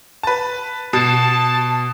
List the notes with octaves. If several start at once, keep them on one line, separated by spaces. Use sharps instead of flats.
B4 A5
B2 A5